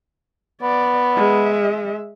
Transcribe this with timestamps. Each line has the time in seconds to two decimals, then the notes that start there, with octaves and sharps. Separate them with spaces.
0.62 B3 D5
1.14 G#3 E5